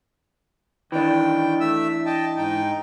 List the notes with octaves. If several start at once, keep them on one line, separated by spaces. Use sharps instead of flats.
D#3 E3 D4 G5
A3 E5 E6
D#5 G5 A5
G#2 D#4 G5